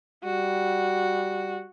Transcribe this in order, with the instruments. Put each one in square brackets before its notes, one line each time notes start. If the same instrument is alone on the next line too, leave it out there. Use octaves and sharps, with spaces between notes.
[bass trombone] G3 [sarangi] F#4